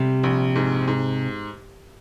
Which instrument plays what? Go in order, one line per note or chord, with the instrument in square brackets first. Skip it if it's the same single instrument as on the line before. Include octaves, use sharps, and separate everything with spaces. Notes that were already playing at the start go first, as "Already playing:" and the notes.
Already playing: [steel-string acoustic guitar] C3 [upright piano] G3
[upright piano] A#1
G#2
G#2